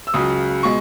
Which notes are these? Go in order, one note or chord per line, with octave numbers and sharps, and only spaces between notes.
E6
C#2 C#3 F#3 D#6
B2 G#3 C#6